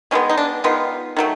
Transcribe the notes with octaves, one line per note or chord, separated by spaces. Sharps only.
D#3 G#3 B3 C#4
D#4
D4
D#3 G#3 B3 F4
D#3 F#3 A3